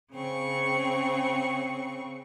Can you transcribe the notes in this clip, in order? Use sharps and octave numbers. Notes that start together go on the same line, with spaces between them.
C#3 C4 C#6